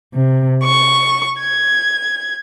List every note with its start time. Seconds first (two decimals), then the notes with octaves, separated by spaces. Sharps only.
0.14 C3
0.63 C#6
1.40 G#6